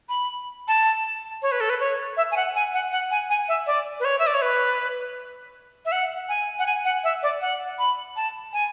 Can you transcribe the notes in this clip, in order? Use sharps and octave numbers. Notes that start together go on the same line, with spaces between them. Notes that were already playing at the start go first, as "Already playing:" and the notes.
B5
A5
C#5
B4
A4
B4
C#5
E5
G#5
F#5
G#5
F#5
F#5
G#5
G#5
E5
D5
B4
C#5
E5
D5
C#5
B4
E5
F#5
G#5
F#5
G#5
F#5
E5
D5
F#5
B5
A5
G#5